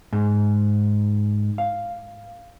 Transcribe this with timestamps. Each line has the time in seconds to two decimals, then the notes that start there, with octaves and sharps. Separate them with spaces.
0.13 G#2
1.58 F5